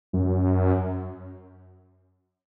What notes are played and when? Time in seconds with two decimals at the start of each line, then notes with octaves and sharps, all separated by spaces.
0.13 F#2